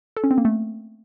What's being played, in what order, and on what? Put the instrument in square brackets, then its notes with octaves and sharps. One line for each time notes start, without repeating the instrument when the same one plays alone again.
[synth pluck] A4
C#4
C4
A#3
A3